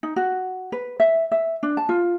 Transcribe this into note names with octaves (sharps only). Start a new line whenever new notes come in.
D#4
F#4
B4
E5
E5
D4
A5
F4